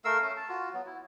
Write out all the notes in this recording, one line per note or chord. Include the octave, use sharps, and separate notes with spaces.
A3 A#4 F5 E6
C#4
A5
F4 F#4
F#3 B3
E4